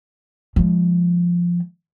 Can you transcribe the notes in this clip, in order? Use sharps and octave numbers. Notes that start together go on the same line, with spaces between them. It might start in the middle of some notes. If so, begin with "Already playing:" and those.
F3 G#3